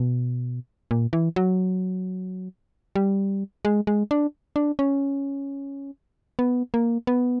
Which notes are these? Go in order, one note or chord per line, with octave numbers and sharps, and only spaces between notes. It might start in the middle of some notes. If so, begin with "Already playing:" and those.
Already playing: B2
A#2
E3
F#3
G3
G#3
G#3
D4
D4
C#4
B3
A#3
B3